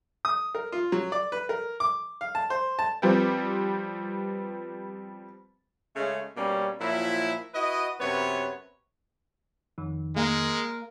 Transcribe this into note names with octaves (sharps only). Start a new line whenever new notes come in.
D#6
A#4
F4
F#3
D5
B4
A#4
D6
F5
A5
C5
A5
F3 G3 B3 C4
C#3 G#3 A3 C#4
B2 G3 A#3 C#4
A#2 F3 F#3 E4
E4 F#4 B4 D#5
F#2 C3 B3 B4 C#5
F2 D#3
G#3 A#3 A#4